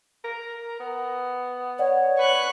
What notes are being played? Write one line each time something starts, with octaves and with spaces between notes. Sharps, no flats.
A#4
B3
C#5 D5 F#5
B4 C#6 F#6